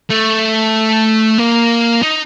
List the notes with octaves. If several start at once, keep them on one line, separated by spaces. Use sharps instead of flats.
A3
A#3
D#4